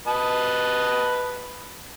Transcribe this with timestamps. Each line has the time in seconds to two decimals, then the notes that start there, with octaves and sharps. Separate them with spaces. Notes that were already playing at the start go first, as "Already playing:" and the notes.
0.07 B4 D#5 A5